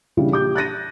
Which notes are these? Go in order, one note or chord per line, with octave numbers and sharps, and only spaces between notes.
C#3 E3 G3 D4
A#1 G4 D6 G6
F#6 A6 A#6 D#7